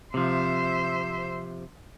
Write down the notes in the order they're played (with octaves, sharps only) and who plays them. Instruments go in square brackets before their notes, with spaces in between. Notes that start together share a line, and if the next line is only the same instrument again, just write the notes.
[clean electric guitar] C3 F3 [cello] C5 E5